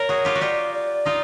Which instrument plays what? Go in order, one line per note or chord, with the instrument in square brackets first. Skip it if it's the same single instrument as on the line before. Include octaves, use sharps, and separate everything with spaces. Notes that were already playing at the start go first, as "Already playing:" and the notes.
Already playing: [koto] A#4 [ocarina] C#5
[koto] F#4 G#4
F4 G4
F#4
[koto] F4 G4 [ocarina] D5
[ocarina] D5
[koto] D#4 F4